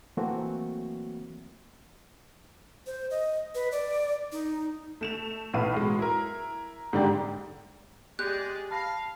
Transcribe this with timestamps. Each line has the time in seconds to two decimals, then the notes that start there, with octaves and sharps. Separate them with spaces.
0.17 E3 F#3 A3 A#3 C4 F#4
2.87 C5
3.11 D#5
3.55 B4
3.72 D5
4.32 D#4
5.01 A3 E7 F7
5.54 B1 A2 E3 B4 F5 D#7
5.76 F#3 G#3
5.99 E4 A#4
6.93 G#2 D3 G3 D5 G5
8.19 G#3 G4 D5 F#6
8.71 F5 A5 B5 A#6